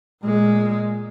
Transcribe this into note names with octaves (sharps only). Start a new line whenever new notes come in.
A#2 G#3